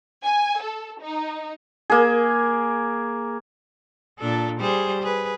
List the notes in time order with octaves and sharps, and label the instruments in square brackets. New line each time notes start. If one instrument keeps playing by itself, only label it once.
[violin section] G#5
A4
D#4
[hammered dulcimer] A#3 G#4
[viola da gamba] A#2 D4 A4
G3 G#4 C5
G#4 B4